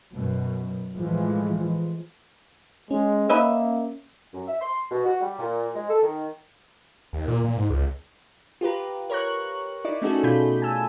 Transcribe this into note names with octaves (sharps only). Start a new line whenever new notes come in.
F#2 B2
A2 E3 F3 G#3
G#3 C#4
A#3 B4 D#5 E5
F#2
E5
C6
B2
F#4
G3
A#2
G#3
A4
D#3
D#2
A#2
A#2
G#2
C#2
F4 G4 B4 A#5
A#4 C#5 A#5 C#6 F#6
D#4 E4 D5
A3 C#4 D#4 F#4 G#4 A4
B2 F4 B5 G6
G#5 A5 E6